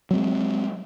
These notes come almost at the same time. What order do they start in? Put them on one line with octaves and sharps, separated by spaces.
F#3 C4 G#3